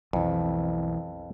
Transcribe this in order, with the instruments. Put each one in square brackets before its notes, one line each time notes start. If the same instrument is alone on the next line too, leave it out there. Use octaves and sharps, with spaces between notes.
[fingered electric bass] B1 E3 [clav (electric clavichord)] F2